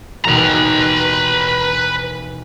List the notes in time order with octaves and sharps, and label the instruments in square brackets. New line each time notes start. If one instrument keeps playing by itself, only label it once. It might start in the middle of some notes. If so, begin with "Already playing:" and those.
[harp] E1 D#2 B2 [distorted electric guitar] B4 A#5